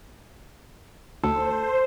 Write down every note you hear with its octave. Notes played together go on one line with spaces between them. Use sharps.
D2 A4 C5